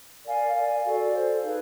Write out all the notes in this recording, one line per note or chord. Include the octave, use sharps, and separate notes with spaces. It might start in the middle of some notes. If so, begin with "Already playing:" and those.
A#4 D5 F5 G#5
A#4 D5 F5 G#5
F#4 A4 D5
A4 C5 F5
D#4 G#4 B4